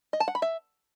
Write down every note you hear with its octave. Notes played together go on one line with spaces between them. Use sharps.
D#5
A5
F#5
B5
E5